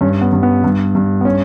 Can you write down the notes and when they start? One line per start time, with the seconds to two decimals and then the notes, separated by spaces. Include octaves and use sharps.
0.01 G2 C#4
0.21 B3
0.33 G2
0.43 B3
0.64 G2
0.95 G2
1.21 B3
1.25 C#4